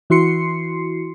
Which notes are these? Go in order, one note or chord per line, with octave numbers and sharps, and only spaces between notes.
E3 E4 F#4 C6 C7 C#7